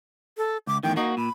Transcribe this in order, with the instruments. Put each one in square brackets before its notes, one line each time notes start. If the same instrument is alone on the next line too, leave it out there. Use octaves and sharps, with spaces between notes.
[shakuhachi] A4
[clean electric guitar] C#2 [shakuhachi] D6
[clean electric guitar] E2 A2 D#3 [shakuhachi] G5
[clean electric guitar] A#3 F#4 [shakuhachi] D#4
[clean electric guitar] A#2 [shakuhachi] B5